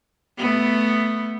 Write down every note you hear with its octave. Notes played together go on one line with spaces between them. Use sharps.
A3 B3